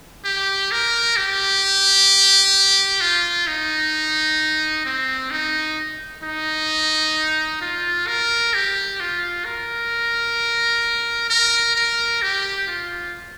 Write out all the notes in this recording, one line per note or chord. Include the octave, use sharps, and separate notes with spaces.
G4
A#4
G4
F4
D#4
C4
D#4
D#4
F4
A#4
G4
F4
A#4
A#4
A#4
G4
F4